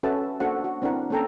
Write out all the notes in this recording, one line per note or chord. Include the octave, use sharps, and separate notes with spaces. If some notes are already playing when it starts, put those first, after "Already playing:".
C#4 F#4 A4 B4 E5 A5
A#3 D4 F#4 A4 C5 F#5
F#4
C4 D4 E4 A#4 F#5
A#3 C#4 A4 G5 A#5